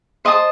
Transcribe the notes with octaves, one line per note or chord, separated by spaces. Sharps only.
C5 D#5 A5 D#6